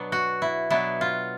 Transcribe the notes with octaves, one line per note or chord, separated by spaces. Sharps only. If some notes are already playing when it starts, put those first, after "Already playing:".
Already playing: B2 F#3 B3 D4
F#4
E4
B2 F#3 B3 D4 E4
F4